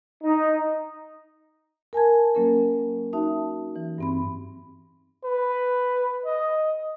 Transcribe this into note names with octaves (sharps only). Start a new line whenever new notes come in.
D#4
A#4 G#5 A5 G#6
F#3 A#3 C#4 A#4
D#4 F#4 E5 A5
E3
G2 C4 B5
B4
D#5